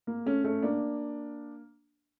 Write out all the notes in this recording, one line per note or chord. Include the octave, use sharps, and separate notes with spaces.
A#3
A3 C#4
A3 C#4
A#3 D4